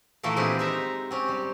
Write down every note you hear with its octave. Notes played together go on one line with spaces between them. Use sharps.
A#2 D#3 E3 A3 A#3
G#3 C4 G4 G#4 B4
D#4 E5 A#5
C4 C#4 G4
G3